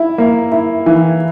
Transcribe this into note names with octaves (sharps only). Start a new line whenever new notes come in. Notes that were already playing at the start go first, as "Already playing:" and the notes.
Already playing: E4
A#3
E4
E3